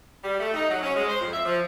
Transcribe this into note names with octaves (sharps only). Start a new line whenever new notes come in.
G3
A3
D#4
F#3
C#4
G#3
C5
F2
E5
F3